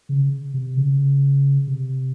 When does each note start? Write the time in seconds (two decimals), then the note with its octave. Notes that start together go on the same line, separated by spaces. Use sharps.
0.09 C#3
0.54 C3
0.77 C#3
1.67 C3